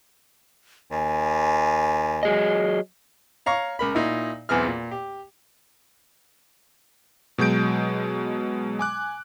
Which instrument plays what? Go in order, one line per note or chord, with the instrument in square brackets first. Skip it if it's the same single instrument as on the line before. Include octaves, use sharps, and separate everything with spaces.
[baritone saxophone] D#2 [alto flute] G#5
[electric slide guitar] F#3 G#4 D#5
[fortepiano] C#5 F5 A#5 C#6
C#2 A#4 B5
A#2 D#4 E4
B1 E2 E3 C4 G#4 F6
A#2
G4
[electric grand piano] B2 F#3 G#3 G6 D7
G#5 D6 F#6